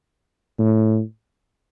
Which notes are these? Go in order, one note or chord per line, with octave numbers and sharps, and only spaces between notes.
A2